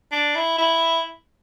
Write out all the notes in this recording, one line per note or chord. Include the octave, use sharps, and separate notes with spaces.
D4
E4
E4